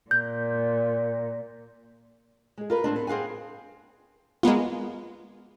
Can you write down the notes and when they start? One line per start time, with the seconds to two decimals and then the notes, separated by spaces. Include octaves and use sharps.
0.11 A#2 G6
2.58 G#3 G#4
2.70 F4 A#4 B4
2.84 A2 A3 C4 D4
2.96 B3
3.07 C4 G#4 F5 F#5 G#5
4.43 G#3 A#3 B3 F4